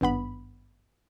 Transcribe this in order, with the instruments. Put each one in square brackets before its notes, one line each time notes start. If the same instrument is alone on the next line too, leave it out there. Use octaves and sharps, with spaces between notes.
[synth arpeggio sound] G#1 G2 B3 B5